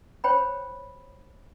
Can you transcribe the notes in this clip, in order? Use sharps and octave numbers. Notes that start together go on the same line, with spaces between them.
C5 C#5 G5 B5